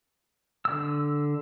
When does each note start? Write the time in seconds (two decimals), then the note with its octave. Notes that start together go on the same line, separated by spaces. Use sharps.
0.65 D3 E6